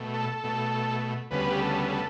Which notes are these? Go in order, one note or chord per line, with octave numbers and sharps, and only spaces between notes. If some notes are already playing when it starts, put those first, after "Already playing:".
Already playing: B2 A3
A4
B2 A3
D2 C#3 G3 B3 B4
G4
A4
A4